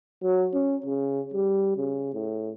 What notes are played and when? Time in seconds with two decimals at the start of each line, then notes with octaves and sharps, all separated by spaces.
0.23 F#3
0.54 C#4
0.86 C#3
1.34 G3
1.77 C#3
2.14 A2